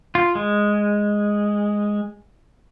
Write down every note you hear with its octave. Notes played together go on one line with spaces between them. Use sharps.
F4
G#3